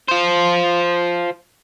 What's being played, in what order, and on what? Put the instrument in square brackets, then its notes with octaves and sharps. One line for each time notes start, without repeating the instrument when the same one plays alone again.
[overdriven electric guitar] F4 C5